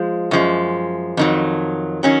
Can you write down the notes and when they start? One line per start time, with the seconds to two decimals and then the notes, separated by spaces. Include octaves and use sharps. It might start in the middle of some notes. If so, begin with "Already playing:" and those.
Already playing: F3 G#3
0.31 F#2 F3 G#3
1.17 F2 D#3 F#3
2.03 D#3 F#3 C#4